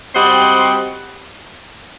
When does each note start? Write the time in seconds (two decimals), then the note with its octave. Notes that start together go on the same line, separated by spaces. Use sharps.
0.14 G3 C4 F#4 C5 D#5